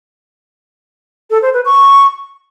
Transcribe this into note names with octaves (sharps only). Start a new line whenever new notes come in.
A4
C5
B4
C#6